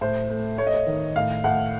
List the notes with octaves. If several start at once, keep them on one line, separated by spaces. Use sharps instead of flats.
A2 C5
A3
A3 C#5
D#5
C#5
D#3
A2 F5
A2 F#5